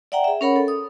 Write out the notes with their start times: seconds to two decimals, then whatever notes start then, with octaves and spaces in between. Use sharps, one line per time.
0.12 D5 E5 F#5 G5 A#5
0.24 G#4 E5
0.41 C#4 G#4 A#4 C#5 F#5 B5
0.56 A4
0.68 D#6